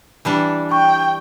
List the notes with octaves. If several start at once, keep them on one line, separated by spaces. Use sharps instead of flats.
E3 G3 D4
G5 C#6